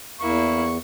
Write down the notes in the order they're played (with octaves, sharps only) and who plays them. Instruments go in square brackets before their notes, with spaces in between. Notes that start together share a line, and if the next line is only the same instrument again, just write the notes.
[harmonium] E2 [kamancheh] A#3 E4 [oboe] C#6